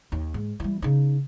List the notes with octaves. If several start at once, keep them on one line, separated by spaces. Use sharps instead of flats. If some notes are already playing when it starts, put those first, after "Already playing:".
D#2 D#3
G#2
E3 G3
C#3 D#4